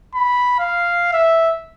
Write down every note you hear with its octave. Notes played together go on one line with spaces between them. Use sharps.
B5
F5
E5